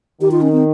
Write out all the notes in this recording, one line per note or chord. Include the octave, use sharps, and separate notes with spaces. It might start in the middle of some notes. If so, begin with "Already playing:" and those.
D#3 G4
F4
C#4
C4